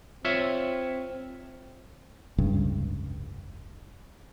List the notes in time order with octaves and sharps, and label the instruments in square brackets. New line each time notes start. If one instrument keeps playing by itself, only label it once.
[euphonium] C4 [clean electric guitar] F4 C#5 E5
[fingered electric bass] F1 C#2 G2 C#3